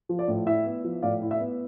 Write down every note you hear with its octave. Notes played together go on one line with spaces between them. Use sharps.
F3
D5
A2
E4 E5
B3
F3
A2 D5 F5
E4
E5
B3